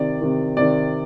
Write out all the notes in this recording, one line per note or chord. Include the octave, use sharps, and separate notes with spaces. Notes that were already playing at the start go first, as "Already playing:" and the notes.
Already playing: C3 D#3 D5
C3 D#3
C3 D#3 D5